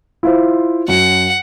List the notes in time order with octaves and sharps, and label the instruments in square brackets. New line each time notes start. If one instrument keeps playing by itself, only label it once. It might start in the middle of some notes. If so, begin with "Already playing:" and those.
[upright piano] E4 F4 C5
[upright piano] F#2 [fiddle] F#5